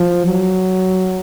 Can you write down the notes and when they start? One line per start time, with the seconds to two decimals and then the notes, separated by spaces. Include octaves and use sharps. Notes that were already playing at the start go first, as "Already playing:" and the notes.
Already playing: F3
0.26 F#3